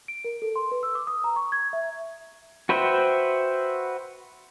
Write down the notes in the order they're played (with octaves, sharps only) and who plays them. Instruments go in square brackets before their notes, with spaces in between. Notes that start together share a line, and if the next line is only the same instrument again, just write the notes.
[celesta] D7
A#4
A4
C6
B4
E6
D6
D#6
A#5
C#6
G#6
E5
[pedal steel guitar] F#4 B4 C5 E5 G5